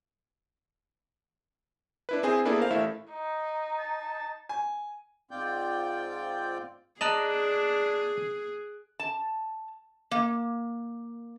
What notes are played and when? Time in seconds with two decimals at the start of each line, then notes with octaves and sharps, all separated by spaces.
2.09 D4 E4 B4
2.23 C4 E4 G#4 C5 G#5
2.45 A#3 B3 D4 E4 G#4 A4
2.59 A#4 C5 F5
2.71 A1 A3 E4 E5
3.11 D#4
3.79 A5
4.49 G#5
5.31 G#2 C4 F4 D5 G5 G6
7.01 D4 G#4 D#5 A5 A#5 F#6 D7 F#7
9.00 A5
10.11 A#3